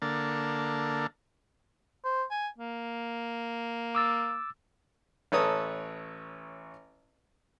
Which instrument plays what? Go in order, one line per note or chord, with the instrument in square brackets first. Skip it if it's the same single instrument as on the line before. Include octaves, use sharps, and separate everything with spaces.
[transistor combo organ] D3 A#3 A4
[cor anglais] C5
G#5
A#3
[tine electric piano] D6 E6 A6
[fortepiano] A1 A4 B4 C#5 A#5 D#6